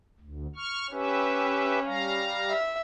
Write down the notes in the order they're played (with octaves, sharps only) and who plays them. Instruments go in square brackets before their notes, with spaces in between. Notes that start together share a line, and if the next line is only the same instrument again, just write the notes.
[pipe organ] D2
C#6 F6
[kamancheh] C#4 [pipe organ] G4 B4 E5
[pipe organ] G3 F5 A#5
[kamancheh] E5